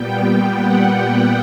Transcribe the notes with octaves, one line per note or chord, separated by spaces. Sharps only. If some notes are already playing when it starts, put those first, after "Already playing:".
Already playing: A#2 G3 B3 G5
F#5